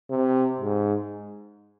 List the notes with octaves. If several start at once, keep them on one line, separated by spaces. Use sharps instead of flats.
C3
G#2